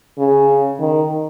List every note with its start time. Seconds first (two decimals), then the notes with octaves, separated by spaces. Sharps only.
0.18 C#3
0.80 D#3